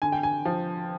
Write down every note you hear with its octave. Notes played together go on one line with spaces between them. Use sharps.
D3 G#5
G5
G#5
F3